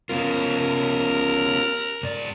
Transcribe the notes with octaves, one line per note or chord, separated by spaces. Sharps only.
B3 C#4 F4 A#4
G#2 D5